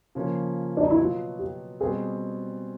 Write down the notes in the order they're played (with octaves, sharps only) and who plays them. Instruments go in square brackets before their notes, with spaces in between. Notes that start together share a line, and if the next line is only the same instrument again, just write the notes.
[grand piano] C#3 F3 A#3 C#4
[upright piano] D4
D#4
E4
[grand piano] B2 F#3 B3 [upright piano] F4
[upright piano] G4
[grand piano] B2 G3 C4 [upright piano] G#4